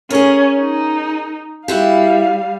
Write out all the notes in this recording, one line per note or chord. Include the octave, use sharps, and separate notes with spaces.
C#4 G#4 A#4
D#4
G3 E4 F#4 G4 F5